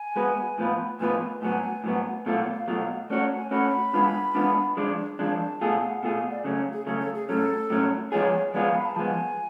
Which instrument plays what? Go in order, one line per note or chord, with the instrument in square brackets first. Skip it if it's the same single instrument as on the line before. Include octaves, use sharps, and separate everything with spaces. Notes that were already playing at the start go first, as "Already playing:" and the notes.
Already playing: [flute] G#5
[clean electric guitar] G#3 B3 F#4 B4
A2 F3 B3 F4 B4
[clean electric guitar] A2 F3 B3 F4 B4 [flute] G#5
[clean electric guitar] A2 F#3 B3 [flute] G#5
[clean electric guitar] A2 F#3 B3
[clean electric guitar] B2 F#3 A3 F4 [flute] F#5
[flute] F5
F5
[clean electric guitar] B2 F#3 A3 F4
[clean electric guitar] A3 C#4 F#4 C#5 [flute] D5
[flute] G#5
[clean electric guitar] A3 C#4 F#4 C#5 [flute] B5
[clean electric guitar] G#3 B3 D4 F4
G#3 B3 D4 F4
F3 G#3 D4
[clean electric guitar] F3 G#3 D4 [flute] A5
[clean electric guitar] B2 A3 F4 G#4
[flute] F5
F#5
[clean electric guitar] B2 A3 F4 G#4 [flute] G#5
[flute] F5
D5
[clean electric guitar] C#3 F#3 A3 C#4
[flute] G#4
[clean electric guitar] C#3 F#3 A3 C#4 [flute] A4
[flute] A4
G#4
[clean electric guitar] A2 F#3 C#4 [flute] A4
[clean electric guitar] A2 F#3 C#4
[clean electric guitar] F3 G#3 B3 F4 G#4 [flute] C#5
[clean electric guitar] F3 G#3 B3 F4 G#4 [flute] D5
[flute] F5
B5
A5
[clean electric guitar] F3 G#3 B3 [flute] G#5